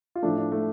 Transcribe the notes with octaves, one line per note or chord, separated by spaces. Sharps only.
F4
A2 F3 A3 D4
D4
A3